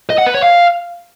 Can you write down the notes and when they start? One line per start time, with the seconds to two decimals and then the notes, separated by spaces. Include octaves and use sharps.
0.10 D#5
0.18 F#5
0.26 B4
0.34 C#5
0.42 F5